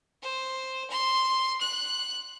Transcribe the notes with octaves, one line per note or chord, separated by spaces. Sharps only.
C5
C6
F#6